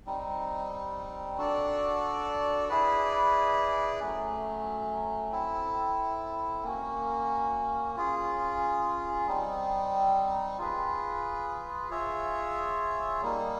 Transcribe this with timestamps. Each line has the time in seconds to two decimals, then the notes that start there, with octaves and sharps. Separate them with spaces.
0.06 G3 C4 D#4
1.38 D4 F#4 A4 D5
2.69 E4 G#4 B4 D5
4.00 F#3 A3 C#4
5.32 C4 E4 A4
6.64 A#3 C#4 F#4
7.96 C#4 F4 G#4
9.27 G3 C4 D#4
10.58 F4 G#4 B4
11.90 F4 G#4 C#5 E5
13.22 G3 A#3 D#4